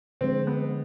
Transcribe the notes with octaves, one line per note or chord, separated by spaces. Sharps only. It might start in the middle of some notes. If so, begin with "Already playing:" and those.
D3 F3 G#3 C4
B3